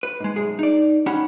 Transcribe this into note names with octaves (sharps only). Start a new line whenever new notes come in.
B4
G#2 G#3
B1 F#2 G#3 G#4
D#4 D5
G#2 C#4 D#4 G4 F#5 B5